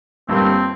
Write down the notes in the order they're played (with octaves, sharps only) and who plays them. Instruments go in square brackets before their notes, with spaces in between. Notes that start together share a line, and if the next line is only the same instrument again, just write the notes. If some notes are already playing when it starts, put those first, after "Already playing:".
[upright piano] G1 G2 G3 A#3 [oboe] C4